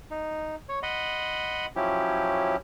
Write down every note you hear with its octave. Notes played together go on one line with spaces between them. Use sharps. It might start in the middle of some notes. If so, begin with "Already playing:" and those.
D#4
C#5
D#5 F#5 B5 C6
F3 F#3 C#4 E4 G4